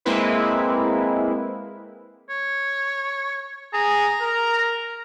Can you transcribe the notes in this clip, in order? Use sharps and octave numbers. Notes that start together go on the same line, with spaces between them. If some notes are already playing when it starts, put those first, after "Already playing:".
G#3 A#3 C4 E4 B4
C#5
G#4 A#5
A#4